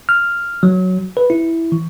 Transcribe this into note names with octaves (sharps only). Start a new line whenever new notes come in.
F6
F#3
B4
E4
E3